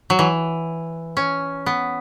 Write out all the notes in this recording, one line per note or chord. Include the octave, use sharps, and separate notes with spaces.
F#3
E3
C#4
B3